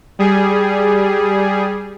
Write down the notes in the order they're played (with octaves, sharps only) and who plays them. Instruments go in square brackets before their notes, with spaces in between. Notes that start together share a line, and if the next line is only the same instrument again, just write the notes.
[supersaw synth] G3 G#4